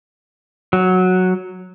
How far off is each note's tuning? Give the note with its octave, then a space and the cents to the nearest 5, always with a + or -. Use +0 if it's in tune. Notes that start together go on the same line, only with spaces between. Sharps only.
F#3 -5